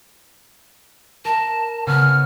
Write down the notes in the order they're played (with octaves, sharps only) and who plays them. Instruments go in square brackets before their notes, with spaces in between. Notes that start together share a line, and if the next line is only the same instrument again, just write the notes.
[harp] A#4 [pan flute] A5
[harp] C#3 B3 C#4 [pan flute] F6